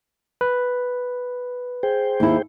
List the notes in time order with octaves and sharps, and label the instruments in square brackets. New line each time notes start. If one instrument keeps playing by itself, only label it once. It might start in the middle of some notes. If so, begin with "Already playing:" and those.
[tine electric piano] B4
[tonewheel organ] G#4 C5 G5
[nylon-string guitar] D#2 E4